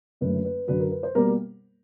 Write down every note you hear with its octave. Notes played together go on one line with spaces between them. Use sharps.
F#1 F#2 D3 F#3 A3 B4
B4
F#2 D3 F#3 B4
A#4
B4
C5
B2 G3 A#3 A#4